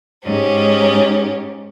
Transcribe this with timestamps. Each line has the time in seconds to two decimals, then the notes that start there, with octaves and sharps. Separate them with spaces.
0.24 G#2 C#4 G4